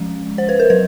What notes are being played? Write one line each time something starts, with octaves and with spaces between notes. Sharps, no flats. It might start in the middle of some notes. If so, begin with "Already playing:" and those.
Already playing: F3 G#3 C#4
C5
B4
A#4
F#3 B4